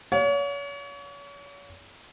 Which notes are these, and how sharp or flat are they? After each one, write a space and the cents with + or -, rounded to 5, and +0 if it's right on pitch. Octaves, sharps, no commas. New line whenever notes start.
C#5 +35 F5 +40